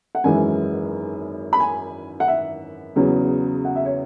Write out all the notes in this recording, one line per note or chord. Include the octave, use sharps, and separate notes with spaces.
F#5
G#1 F#2 E3 G#3 G#5
B5
G#5
F#5
E5
E2 C#3 F#3
F#5
E5
C#5